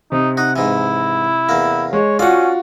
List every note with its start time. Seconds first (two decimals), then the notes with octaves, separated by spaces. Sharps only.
0.12 C3 D#4
0.37 D#4 F#5
0.56 G#2 E3 E4
1.49 E2 A#3
1.93 G#3 C#5
2.19 C#4 F4 F#4 D5 F#5